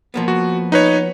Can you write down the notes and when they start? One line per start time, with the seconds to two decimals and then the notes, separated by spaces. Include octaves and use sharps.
0.14 F3 A#3 B3
0.28 F#4
0.72 D#4 B4 C#5